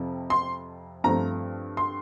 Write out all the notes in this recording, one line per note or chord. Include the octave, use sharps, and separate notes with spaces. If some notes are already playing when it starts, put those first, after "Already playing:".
Already playing: F2 C3 F3
C6
G2 F3 A3 C4 A#5
C6